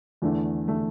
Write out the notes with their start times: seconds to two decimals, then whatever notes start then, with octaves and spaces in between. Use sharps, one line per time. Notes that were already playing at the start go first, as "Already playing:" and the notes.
0.22 E2 D3 A3
0.68 D3 A3